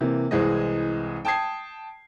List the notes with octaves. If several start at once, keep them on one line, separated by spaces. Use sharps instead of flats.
C3 E3 A#3
C2 E3 G#3 C4 G#4 D#5
G5 A5 D#6 G#6 C7